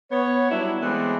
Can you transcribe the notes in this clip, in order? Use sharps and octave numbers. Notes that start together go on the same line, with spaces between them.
B3 C#5
F#3 G3 D4 E4
E3 G#3 A3 B3 C4 D4